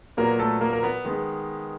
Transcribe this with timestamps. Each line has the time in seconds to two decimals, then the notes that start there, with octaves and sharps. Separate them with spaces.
0.17 A#2 F#3 A#3 B3 A#4
0.39 A3 A4
0.61 A#3 A#4
0.73 A#4
0.83 B3 B4
1.05 D#3 G#3 B3